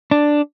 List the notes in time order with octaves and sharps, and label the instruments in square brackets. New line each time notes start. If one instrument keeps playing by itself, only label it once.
[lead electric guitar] D4